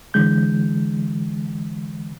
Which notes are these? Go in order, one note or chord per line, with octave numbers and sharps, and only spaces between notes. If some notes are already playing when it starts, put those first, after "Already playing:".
D3 E3 G#3 G6